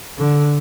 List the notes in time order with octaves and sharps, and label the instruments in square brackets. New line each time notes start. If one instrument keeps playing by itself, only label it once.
[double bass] D3